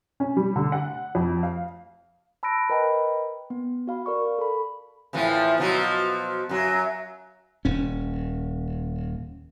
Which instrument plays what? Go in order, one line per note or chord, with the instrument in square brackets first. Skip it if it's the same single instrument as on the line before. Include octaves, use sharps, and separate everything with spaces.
[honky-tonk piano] C#4
G3
D3
F#5
F2
F5
[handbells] A5 B5 E6 F#6 A#6 D7
A#4 B4 D#5 G5 A#5 B5
B3
F#4 F5 B5
A#4 D5 C#6
A4 B5
[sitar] A2 E3 F3
B2 F3 F#3
F#2 F#3
[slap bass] D#1 C#4